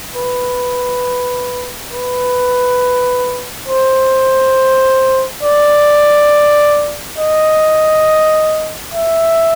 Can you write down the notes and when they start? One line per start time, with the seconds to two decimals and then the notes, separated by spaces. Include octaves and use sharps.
0.16 B4
1.92 B4
3.68 C5
5.43 D5
7.18 D#5
8.94 E5